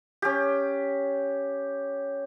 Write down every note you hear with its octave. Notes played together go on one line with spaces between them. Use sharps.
C#4 G4